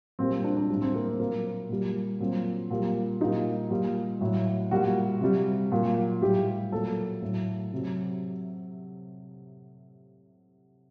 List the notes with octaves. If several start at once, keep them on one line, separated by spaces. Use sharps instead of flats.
A#2 G3 C4
C4
D4
D4
A2 G3 D4
C4
A#3
C4
A#2 F#3 A#3
A#2 G3
A#2 F#3 C4
A#2 G3
A#2 G3 D#4
A#2 G3
A2 F#3
A#2 G3 F#4
C3 G3
A#2 F#3
A2 G3 G4
A#2 F#3 A4
A2 F#3
C3 F#3